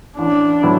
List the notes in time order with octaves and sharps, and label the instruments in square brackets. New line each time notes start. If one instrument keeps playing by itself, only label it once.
[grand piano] A1 [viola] D4
[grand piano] A2 F#3 B3 E4